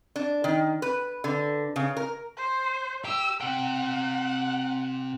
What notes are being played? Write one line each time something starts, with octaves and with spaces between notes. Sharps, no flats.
D4
D#3
B4
D3
C#3
A#4
C5
G4 E6
C3 F#5 G5